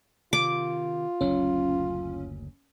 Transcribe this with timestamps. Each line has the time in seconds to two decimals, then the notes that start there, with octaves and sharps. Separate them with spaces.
0.33 C3 D#3 F4 D6
1.21 F#1 D2 F#3 C#4